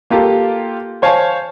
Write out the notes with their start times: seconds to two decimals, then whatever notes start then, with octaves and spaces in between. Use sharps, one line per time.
0.10 A#3 F4 G4 A4
1.02 C5 C#5 F5 G#5 A5